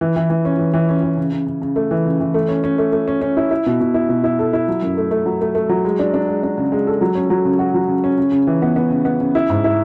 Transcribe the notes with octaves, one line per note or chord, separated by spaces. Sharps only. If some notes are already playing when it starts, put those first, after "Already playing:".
E3
E3
E3
C#4
E3
E3
C#4
E3
C#3
C#3
C#3
C#3
A3
E3
C#3
E3
A3
C#4
C#4
A3
A3
C#4
C#4
E4
E4
B2
B2
E4
B2
E4
A4
E4
F#3
F#2
A3
A3
F#3
A3
A3
F#3
G#3
D4
D4
G#3
D4
C#3
G#3
A4
F#3
C#4
F#3
C#3
F#4
F#3
C#3
C#4
C#3
C#3
E3
B3
B3
C#3
B3
C#3
E4
G#2
E4